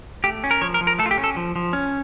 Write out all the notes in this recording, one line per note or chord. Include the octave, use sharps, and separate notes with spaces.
A3 G4
C#4
A#4
F3 C#5
A#4
F3
A#4
A3 A4
F4
G4
C#4
A4
F3
F3
C#4